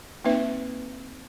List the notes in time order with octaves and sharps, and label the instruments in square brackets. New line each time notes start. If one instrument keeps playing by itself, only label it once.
[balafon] A#3 C4 D#4 B4 E5